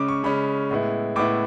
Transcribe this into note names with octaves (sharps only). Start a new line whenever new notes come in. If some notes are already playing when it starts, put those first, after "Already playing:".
Already playing: C#3 G#3 C#4 D6
C#6
C#3 G#3 C#4 B5
A2 G#3 B3 E4
A2 G#3 B3 E4 D6